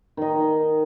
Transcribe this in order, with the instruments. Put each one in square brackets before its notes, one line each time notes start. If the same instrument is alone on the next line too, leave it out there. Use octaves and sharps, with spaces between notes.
[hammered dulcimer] D#3 D#5